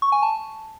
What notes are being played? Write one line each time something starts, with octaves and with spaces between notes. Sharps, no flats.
C#6
G#5
A5